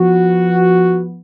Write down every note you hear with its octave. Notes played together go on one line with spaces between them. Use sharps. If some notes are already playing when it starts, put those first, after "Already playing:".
Already playing: F3 B3 F#4